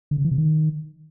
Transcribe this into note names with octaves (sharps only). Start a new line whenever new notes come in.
D3
C#3
E3
C3
D#3